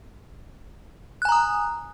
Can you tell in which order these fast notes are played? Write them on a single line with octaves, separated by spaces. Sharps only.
F#6 G#5 A#5 D#6